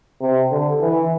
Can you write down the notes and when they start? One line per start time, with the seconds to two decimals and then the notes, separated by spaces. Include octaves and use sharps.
0.21 C3
0.51 D3
0.81 E3